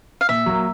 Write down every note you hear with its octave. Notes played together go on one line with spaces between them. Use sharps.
F5
A#2 E5
F#3 A#3